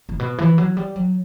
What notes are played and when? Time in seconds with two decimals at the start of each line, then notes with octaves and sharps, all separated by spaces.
0.09 A2
0.20 B2
0.38 E3
0.58 F#3
0.77 G3
0.96 F#3